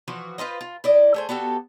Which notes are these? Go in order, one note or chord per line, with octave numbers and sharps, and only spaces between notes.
E3 F3 F#4
F4 B4 C5 D#5
F4
E4 D5 D#5
A3 G#4 C5
B3 F#4 G4 A4